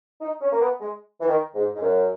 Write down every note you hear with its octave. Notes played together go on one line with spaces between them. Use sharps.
D#4
C#4
A#3
B3
G#3
E3
D#3
G#2
G#2
F#2